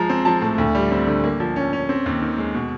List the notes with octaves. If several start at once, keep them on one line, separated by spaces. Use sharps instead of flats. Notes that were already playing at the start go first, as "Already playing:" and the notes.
Already playing: F3 G#3 A#5
C4
F3 A5
A2
D2
G3
C4
D3
A#3
F3
C#4
C#4
C4
D#2
D#3
G#3
B2